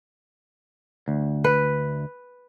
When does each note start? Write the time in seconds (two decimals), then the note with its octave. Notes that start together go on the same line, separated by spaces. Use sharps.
1.08 D2
1.44 B4